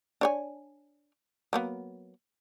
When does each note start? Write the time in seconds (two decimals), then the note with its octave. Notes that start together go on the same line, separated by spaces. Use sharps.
0.21 D4 C#5 G#5
1.53 F#3 A#3 B3